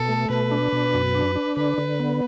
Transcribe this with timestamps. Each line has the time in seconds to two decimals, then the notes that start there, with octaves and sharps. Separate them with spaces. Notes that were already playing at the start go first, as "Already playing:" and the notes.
Already playing: B2 A4
0.09 A3
0.30 B2 B4
0.51 D4
0.72 B2
0.94 F#2
1.15 D4
1.36 D4
1.57 D3 B4
1.78 D3
2.00 B3